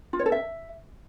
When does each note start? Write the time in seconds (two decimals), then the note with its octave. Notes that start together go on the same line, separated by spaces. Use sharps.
0.13 F4
0.19 C#5
0.26 A4
0.32 E5